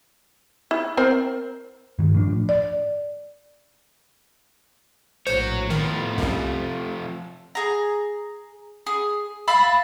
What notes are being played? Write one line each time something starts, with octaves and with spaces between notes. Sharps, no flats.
E4
C4 A#4 C5
G2 D#3
A2 F3 D4
D5
A#1 A2 F#4 C5 C#5
A2 D#3 F3 A3 B3
C2 F#2 C3
G#4 A#5
G#4
E5 F5 A5 B5